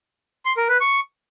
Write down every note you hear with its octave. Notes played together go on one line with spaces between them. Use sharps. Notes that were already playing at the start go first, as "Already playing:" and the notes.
C6
A#4
B4
C#6